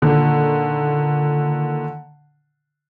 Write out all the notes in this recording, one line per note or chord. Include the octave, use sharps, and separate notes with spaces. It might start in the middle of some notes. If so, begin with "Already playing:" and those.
A#2 D3 D#3